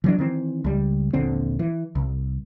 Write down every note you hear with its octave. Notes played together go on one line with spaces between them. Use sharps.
E3 F#3 D4
D#3 E3 C4
C#2 G3
D#1 A#1 D3 C4
E3
C2